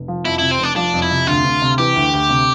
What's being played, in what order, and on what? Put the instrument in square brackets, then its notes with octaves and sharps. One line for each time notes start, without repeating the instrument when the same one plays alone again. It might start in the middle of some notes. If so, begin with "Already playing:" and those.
Already playing: [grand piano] F1
F3
[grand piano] F2 [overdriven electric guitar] E4
[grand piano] C3 [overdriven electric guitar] E4
[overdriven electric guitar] C4
[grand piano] F1 [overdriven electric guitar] D4
[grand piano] F3 [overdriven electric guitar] D4
[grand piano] F2
[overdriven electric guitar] E4
[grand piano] C3
[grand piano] D2 [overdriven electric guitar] F4
[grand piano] D2
C3
[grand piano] E3 [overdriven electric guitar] G4
[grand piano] D2
D2
C3